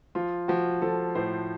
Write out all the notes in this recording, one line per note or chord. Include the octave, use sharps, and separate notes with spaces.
F3 F4
F3 F#4
F3 A4
A2 C5